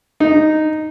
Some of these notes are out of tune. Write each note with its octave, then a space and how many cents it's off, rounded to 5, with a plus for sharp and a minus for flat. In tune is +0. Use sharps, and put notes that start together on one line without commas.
D#4 -5